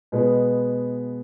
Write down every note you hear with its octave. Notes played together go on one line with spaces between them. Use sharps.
B2 G#3 B3